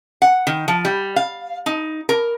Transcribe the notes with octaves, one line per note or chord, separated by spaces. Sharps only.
F#5
D#3
F3
G3
F5
D#4
A#4